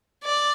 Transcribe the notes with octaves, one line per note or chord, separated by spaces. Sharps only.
D5